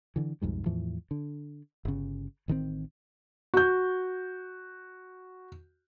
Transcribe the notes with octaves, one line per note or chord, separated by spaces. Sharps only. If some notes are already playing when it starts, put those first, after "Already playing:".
D3 E3
B1 F2 G#2 G3
E2 A2 E3 F3
D3
G1 C#3
A1 D#3 E3 C4
F#4 G6